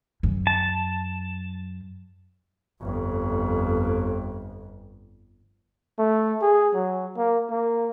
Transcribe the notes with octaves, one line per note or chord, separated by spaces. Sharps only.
F#2
A5
G1 F2
A3
G#4
F#3
A#3
A#3